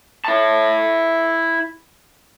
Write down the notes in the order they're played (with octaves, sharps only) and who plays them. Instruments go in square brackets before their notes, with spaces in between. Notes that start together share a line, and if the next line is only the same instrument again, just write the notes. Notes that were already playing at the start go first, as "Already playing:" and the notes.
[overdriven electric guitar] E4 A5